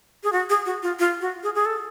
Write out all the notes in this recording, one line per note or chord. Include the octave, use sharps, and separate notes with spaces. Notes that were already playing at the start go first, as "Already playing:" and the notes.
G#4
F#4
G#4
F#4
F4
F4
F#4
G#4
G#4
A4